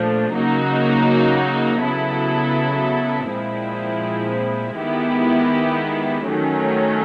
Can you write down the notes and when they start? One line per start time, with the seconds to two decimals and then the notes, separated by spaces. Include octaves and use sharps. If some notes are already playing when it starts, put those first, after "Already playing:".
Already playing: A#2 F3 A3 D4
0.33 C#3 F#3 A#3 D#4 F#4
1.82 C#3 F#3 B3 E4 A4
3.29 A#2 F3 G#3 C4 E4
4.78 D#3 G#3 B3 E4 G4
6.26 D#3 F#3 A3 C#4